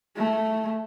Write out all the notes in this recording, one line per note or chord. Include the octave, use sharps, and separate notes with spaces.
A3